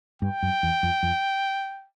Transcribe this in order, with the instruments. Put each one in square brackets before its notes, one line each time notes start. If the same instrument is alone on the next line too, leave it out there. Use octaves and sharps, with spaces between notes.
[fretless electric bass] G2 [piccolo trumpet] G5
[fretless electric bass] F#2
E2
F2
F2